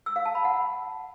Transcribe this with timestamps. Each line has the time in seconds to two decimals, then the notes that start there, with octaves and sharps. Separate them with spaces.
0.06 E6
0.16 F5
0.25 A5
0.35 B5
0.45 F#5